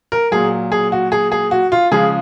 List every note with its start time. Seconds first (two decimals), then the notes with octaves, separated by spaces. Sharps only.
0.12 A#4
0.31 A#2 F#3 G#4
0.72 G#4
0.92 F#4
1.12 G#4
1.32 G#4
1.51 F#4
1.72 F4
1.91 C#3 F3 G#3 G#4